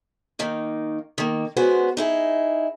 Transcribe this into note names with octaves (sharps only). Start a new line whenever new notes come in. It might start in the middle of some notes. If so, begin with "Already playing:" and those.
D#3 A#3 D#4
D#3 A#3
G#3 B3 C#4 F#4 C5
D#4 E4 G#4